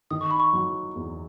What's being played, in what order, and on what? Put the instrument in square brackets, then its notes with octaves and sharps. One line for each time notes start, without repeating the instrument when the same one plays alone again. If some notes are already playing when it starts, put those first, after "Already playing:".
[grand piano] D#3 [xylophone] D#6
[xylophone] C#6
B5
C#6
[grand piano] F#3
E2